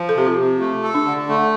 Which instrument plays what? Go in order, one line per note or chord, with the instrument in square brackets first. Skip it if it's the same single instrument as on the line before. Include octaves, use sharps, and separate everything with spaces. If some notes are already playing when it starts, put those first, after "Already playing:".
Already playing: [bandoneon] F3
[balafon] A4
[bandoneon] C3 [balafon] G4
[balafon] F4
[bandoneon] C3
A3
A4
[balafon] D4
[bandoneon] D3
A3